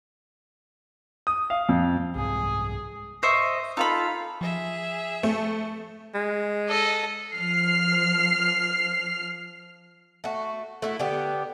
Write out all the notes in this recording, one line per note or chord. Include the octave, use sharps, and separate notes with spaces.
D#6
F5
F2
C2 G#2 G#4
C5 D#5 E5 C#6
D#4 F4 A4 F5 B5
F3 G#4 E5
A3
G#3
A4 D#5
F3 F6 C7
A3 F#4
A3 E4 F#4
D3 B3 G4